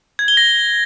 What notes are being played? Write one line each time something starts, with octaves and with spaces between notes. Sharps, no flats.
G#6
G7
A#6